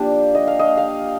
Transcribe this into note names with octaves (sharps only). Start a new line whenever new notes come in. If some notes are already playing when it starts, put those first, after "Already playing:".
Already playing: F3 A#3 D4 G4
D#5
F5
D#5
F5